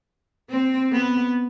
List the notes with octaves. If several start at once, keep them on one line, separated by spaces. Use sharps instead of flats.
C4
B3